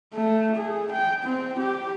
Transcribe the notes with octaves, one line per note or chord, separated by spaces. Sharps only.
A3
G#4
G5
C4
G4